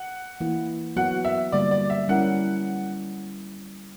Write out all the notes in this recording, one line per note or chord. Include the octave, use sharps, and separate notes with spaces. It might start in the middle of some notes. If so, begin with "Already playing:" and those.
Already playing: F#5
E3 A#3 E4
F#3 B3 F#4 F#5
E5
D3 G3 A#3 D5
D5
E5
G3 C#4 E4 A#4 F#5